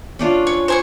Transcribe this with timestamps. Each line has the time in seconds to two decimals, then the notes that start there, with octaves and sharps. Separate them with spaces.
0.19 C#4 D4 F4
0.47 C#5
0.68 C5 G#5 C#6